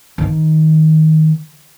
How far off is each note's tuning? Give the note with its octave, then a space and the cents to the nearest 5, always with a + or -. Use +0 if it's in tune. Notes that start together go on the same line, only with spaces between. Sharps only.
D#3 +15